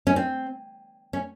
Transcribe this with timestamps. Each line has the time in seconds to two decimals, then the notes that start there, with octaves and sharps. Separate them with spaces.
0.07 C#4
0.16 C4
1.13 C#4